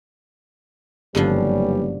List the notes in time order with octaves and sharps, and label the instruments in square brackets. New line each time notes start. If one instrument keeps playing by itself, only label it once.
[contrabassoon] F#1 [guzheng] G2 D3 F3 [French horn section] G3 B3 C#4